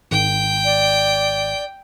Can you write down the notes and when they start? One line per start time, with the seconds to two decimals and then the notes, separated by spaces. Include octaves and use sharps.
0.11 G#1 G5
0.65 D5